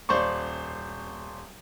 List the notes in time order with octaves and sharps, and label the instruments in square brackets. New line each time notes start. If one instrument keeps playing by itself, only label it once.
[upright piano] D#1 C5 D5 C6 C#6